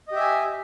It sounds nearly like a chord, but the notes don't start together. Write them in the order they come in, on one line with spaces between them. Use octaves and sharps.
D#5 G4 E5 G#5